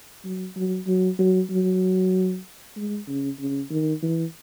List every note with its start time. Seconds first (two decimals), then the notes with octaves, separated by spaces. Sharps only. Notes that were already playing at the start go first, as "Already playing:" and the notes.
0.25 F#3
0.56 F#3
0.87 F#3
1.19 F#3
1.50 F#3
2.76 G#3
3.08 C#3
3.40 C#3
3.71 D#3
4.03 E3